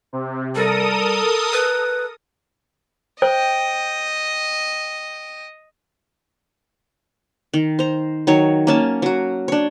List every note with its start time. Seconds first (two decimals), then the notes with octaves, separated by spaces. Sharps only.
0.13 C3
0.55 G3 A4 A#4 D#6
1.53 B4
3.22 C5 D#5 G5
7.54 D#3
7.79 C5 A#5
8.27 D#3 F#3 C#5
8.67 A#3 C#4 A5
9.02 F#3 F#4
9.48 D4 C#5